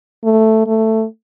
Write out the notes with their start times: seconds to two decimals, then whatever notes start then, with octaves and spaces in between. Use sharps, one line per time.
0.24 A3
0.66 A3